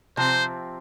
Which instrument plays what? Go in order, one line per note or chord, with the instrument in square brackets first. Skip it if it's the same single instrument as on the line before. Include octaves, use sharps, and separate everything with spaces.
[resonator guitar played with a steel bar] C3 F3 C4 [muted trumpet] C5